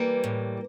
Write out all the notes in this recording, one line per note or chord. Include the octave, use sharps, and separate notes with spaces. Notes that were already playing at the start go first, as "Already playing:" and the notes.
Already playing: E3 G3 A#3
A2